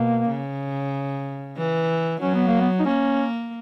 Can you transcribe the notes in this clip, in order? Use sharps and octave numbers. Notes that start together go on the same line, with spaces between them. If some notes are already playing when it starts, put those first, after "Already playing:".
Already playing: B2 A#3
C#3
E3
F#3 C#4
B3
A#3
B3
D#4
A#3 C#4